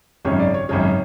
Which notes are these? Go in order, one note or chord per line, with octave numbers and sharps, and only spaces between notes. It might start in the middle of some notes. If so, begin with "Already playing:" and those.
G#1 F#2 C#3 C#5
D5
C#5
G#1 F#2 C#3 C#5